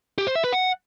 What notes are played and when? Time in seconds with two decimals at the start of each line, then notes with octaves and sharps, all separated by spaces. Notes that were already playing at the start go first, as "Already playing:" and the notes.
0.18 G4
0.27 C5
0.35 E5
0.44 B4
0.53 F#5